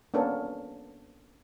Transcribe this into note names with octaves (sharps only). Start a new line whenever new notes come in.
A#3 B3 C#4 D4 A4